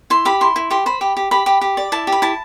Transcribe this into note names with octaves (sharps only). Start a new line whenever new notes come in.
E4 C6
G4 B5
E4 C6
E4
G4 C6
C5 B5
G4
G4
G4 B5
G4
G4
D5
E4 A5
G4
B5
E4 A5